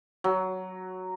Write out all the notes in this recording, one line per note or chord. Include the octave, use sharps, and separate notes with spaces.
F#3